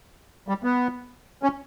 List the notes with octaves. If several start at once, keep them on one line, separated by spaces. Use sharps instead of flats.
G3
B3
C#4